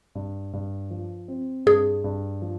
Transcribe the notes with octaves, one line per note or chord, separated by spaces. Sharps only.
G2
G2
F3
C4
G2 G#4
G2
F3